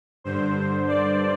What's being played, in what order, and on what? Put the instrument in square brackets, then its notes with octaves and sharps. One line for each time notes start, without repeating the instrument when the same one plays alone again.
[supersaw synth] G2 D3 C5
D5